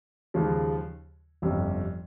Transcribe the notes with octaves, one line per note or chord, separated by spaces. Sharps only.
D#2 C#3 F3 G#3
G1 F2 C3 G3 C#4